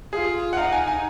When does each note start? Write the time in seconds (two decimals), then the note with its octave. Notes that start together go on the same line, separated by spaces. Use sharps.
0.13 F4 G#4
0.53 F#5
0.57 D#4 F5
0.72 G#5
0.87 G#5